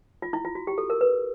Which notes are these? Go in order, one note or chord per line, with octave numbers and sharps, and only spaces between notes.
F4
E4
F4
F#4
G4
A4
A#4
B4